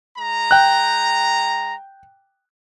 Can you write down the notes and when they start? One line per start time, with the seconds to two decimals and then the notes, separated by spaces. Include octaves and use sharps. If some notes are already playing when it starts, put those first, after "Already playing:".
0.17 G#3 A#5
0.51 G5 F#6